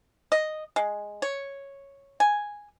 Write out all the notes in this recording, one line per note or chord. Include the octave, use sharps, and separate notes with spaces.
D#5
G#3
C#5
G#5